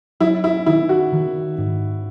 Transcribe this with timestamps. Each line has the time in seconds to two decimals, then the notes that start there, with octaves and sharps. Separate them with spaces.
0.20 F#3 E4
0.44 E4
0.66 D#3 E4
0.89 F#4
1.13 D#3
1.58 G#2